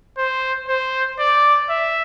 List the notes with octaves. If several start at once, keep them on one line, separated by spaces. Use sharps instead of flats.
C5
C5
D5
E5